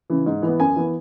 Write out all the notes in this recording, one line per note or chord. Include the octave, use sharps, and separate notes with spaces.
C#3 E3
G#2
E3 B3
F#2 G#5
E3 B3